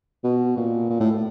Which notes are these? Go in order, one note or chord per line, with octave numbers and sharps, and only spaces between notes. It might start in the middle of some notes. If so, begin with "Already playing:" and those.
B2
A#2
A#2
A2